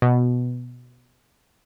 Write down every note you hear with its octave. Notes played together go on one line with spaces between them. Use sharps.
B2